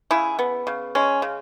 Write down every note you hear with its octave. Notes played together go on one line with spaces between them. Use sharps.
C#3 E4 G#4
B3
C#3
G#3 C#4
C#3